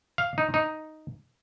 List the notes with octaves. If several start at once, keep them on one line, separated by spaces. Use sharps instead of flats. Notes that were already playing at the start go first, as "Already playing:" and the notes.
F5
D#4
D#4